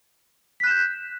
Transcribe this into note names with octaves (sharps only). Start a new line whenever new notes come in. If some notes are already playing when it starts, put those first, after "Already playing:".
F#6 G6 B6 E7